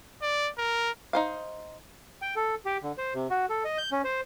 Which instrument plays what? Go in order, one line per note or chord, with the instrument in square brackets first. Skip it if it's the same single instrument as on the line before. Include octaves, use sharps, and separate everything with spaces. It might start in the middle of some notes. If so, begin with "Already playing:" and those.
[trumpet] D5
A#4
[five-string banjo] D#4 C5 F5
[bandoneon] G5
A4
G4
D3
C5
C3
F#4
A4
D#5
G6
C#4
C5